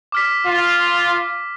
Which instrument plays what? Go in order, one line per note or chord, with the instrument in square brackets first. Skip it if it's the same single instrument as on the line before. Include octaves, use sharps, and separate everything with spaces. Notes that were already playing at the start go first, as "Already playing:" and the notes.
[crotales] D6 F6 B6
[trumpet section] F4